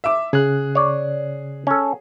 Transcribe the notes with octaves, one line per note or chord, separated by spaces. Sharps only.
E5 D6
C#3 G#4 F#6
C#5 D5
C#4 A4